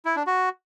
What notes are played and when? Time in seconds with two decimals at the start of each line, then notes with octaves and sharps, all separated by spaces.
0.05 E4
0.16 D4
0.27 F#4